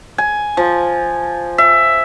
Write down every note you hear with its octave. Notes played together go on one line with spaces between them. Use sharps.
G#5
F3
E5